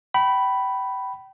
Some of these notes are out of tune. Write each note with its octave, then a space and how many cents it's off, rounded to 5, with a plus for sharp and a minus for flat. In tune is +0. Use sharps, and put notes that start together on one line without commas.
G5 -30 B5 +0